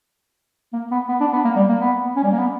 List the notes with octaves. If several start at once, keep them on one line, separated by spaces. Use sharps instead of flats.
A#3
B3
B3
D4
B3
A#3
G3
A#3
B3
C#4
G3
A#3
B3